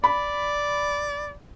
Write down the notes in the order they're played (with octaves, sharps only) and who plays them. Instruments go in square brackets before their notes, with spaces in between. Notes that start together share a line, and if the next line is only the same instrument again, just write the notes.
[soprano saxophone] D5 [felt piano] B5